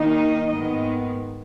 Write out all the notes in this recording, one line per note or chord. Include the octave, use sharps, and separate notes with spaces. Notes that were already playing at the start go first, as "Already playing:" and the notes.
Already playing: D#3 A#3 D#4
D#5
G#2 D#3 G#3 B3 D#5